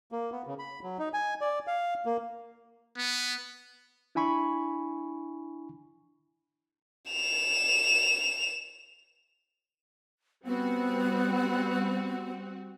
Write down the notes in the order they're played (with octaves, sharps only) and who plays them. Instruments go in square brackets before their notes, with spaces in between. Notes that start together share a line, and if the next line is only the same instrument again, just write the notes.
[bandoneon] A#3
B3
C#3
B5
F#3
D#4
G#5
D5
F5
A#3
[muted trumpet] B3
[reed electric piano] D4 E4 G#5 B5 C#6
[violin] E7 F7
[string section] G3 C4 F#4 [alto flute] B3